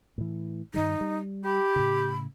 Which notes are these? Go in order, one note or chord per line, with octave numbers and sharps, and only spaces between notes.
A2 E3
G2 D#3 G3 D#4
G3
G4 B5
A2 C#3